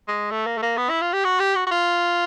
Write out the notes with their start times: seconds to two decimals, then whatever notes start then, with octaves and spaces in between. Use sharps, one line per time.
0.08 G#3
0.31 A3
0.46 A#3
0.58 A3
0.62 A#3
0.77 B3
0.90 E4
1.02 F4
1.13 G4
1.25 F#4
1.40 G4
1.55 F#4
1.67 F#4
1.71 F4